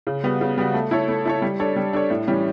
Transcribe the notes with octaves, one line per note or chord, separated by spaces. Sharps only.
C#3
G3 B3 F#4
C#3
G3 B3 F#4
A3
E4 A4 C#5
A3
E4 A4 C#5
G3
D4 A4 C#5
G3
D4 A4 C#5
A2
E3 G3 C#4